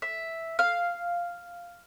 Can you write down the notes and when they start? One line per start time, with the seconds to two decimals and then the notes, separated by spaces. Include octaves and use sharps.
0.02 E5
0.59 F5